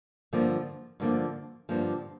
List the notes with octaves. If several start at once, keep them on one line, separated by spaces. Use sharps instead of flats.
G2 D3 F3 A#3
G2 D3 F3 A#3
G2 D3 F3 A#3